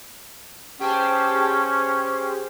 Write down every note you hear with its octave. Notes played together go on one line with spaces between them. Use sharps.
C#4 G4 G#4 C5 G5 A5